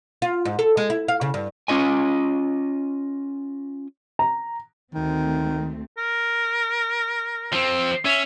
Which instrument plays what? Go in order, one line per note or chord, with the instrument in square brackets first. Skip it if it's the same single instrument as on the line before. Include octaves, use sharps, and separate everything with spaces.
[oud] F4
G#2
A4
G#3
E4
F5
C#3
G2
[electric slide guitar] C#4 F4 D#5 G#5
[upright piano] A#5
[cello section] D2 A3 C4 [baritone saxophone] D#3
[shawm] A#4
[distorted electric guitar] F3 C4
[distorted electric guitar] C#4 [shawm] E5